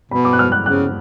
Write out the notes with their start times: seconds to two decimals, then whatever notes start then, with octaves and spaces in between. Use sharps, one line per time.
0.11 B2 B5
0.25 D6
0.33 F#6
0.39 F6
0.52 F#6
0.66 C#3 F#6